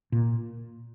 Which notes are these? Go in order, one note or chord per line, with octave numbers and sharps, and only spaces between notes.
A#2